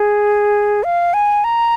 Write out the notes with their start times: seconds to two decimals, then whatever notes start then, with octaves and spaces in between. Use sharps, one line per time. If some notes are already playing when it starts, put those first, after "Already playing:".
Already playing: G#4
0.84 F5
1.14 G#5
1.44 A#5